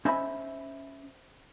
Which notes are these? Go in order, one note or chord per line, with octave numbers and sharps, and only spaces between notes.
C#4 C5 D#5 E5 B5